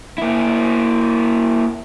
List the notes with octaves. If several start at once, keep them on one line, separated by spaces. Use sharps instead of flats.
A#3 E4